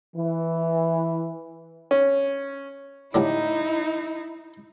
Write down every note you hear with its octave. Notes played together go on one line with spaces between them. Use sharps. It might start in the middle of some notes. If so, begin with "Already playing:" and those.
E3
C#4
A2 D3 G3 D#4 E4